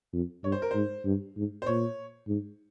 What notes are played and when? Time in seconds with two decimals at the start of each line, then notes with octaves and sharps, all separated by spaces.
0.13 F2
0.44 G2 C#5
0.52 C5
0.62 A#4
0.71 G#2 C5
1.05 G2
1.36 G#2
1.62 C5
1.66 A#2 C#5
2.28 G#2